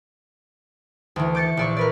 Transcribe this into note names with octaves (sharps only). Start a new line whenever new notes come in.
D2 E3
D6 G6 A6 C#7
A#1 D5 C#6
A#4 B4 D5